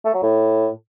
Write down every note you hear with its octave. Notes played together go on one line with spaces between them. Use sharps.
A3
F#3
A2